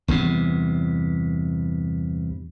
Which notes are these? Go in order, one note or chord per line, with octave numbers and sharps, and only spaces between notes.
E2 G2 C3